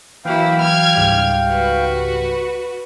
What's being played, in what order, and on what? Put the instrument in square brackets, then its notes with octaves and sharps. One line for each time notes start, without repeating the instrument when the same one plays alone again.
[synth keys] E3 F#3 [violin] A#3 E4 [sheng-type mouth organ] F5 G5
[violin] F6 G#6
[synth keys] C#2 G#2 G3
[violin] F#4 B4